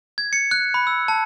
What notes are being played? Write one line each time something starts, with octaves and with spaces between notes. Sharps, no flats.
G#6
C#7
F#6
B5
E6
A5